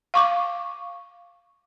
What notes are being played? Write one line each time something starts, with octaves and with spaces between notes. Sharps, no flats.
F5 C#6 D6